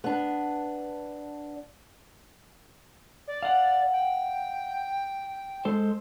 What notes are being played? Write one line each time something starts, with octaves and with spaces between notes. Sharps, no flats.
B3 D4
D5
F5 F#5
G5
G#3 A4 C5